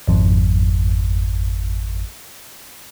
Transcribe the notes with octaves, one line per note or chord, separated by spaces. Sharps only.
G#1 F2